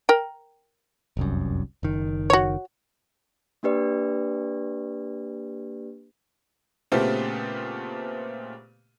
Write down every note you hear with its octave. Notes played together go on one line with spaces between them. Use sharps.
A#4 G5
F1 C2 F#2
F#1 D#3
F#4 C#5
A#3 D4 G4 B4 D5
A#2 C#3 A3 B3 C4 G4